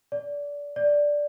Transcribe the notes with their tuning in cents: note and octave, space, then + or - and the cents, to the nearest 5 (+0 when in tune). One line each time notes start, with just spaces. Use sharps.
D5 -25
D5 -5